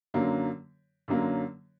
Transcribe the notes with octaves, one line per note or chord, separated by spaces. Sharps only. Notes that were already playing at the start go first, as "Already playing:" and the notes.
F#2 D3 F#3 A#3
F#2 D3 F#3 A#3